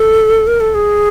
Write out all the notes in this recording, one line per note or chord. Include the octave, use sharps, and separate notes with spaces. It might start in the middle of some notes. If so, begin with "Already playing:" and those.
Already playing: A4
A#4
A4
G#4